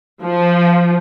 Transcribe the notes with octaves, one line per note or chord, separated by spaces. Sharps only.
F3